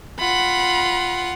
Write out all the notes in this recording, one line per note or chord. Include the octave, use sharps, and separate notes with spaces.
F4 F#5 B5